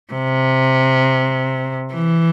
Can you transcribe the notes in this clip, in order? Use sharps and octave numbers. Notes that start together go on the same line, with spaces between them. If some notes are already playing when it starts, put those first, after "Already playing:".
C3
E3